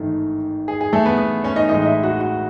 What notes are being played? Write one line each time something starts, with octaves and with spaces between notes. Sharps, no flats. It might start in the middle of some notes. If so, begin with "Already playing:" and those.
Already playing: A1 G#2 D#3 A3 A4
G#4
G#4
A3 A4
B3 B4
B3 B4
C#4 C#5
D#4 D#5
A1 A2 G#3 D#4 D#5
D#5
E4 E5
F#4 F#5
F#4 F#5